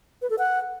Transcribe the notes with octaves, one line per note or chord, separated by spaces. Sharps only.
B4
A4
F#5